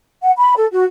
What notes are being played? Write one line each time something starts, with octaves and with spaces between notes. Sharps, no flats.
F#5
B5
A4
F#4